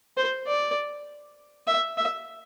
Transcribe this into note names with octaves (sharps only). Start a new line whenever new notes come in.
C5
D5
E5
E5